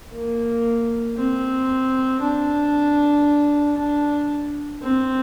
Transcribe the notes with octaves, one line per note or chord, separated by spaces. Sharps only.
A#3
C4
D4
D4
C4